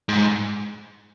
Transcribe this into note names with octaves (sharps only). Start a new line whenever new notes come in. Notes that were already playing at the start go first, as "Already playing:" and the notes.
G#2